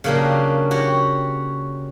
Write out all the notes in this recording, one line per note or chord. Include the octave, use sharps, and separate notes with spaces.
C#3 F#3 A#3 D4 G4
F#4 G4 C#5